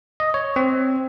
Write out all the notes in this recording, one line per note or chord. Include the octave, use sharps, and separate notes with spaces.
D#5
C#5
C4